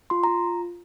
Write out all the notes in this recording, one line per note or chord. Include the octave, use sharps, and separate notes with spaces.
F4 C6
A#5
F4